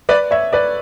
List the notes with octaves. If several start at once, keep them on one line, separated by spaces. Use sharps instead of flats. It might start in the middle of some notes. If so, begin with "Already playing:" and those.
B4 D5
C#5 E5
B4 D5